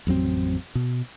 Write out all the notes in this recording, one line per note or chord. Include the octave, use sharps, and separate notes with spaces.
A1 F2 F#3 C4
B2